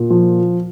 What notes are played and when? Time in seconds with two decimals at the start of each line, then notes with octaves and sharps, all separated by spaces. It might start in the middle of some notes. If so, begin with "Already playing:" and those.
Already playing: A#2
0.10 F3